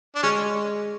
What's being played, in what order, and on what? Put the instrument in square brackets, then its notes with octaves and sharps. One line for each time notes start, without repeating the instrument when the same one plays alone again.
[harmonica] D4
[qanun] G#3 [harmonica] C#4